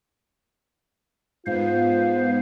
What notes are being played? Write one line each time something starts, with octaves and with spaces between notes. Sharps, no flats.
G#2 B3 F4 C5 F5